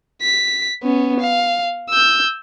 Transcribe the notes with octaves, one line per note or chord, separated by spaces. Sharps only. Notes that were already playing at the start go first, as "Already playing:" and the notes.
B6
B3 C#4
F5
E6 G6